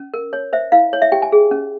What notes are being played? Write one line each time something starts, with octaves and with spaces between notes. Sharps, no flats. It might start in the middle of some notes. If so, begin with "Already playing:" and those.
Already playing: C#4
A#4
C#5
C5 E5
E4 F5
C#5
E5
G4 G5
G#5
G#4
C#4